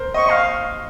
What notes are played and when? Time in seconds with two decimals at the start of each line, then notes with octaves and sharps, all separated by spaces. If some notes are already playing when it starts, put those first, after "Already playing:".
Already playing: A#4 C5
0.14 D#5 C#6
0.26 D#5 F5